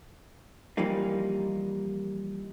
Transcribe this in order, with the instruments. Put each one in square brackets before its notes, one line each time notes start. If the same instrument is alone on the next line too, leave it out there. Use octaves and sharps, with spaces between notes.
[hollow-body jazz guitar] E3 F3 G3 A#3 D#4